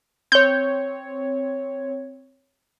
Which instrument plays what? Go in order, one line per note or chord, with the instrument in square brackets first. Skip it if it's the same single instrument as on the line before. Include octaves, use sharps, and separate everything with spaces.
[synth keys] C4 C#5 [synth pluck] G6